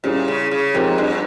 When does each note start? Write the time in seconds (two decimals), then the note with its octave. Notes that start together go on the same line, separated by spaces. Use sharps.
0.04 A#2 G3 C#4 E4 G#4
0.28 C#3
0.51 C#3
0.74 G#2 F3 C4 G4 A#4
0.98 G2